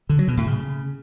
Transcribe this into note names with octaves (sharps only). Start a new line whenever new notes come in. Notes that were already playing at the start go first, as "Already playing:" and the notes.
D3
F#3
B2
A2
C#3